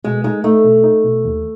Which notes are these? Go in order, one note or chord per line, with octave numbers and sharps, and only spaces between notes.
B2 G#3
G#3 D#4
A3 D#4
B2
D#4
B2
D#2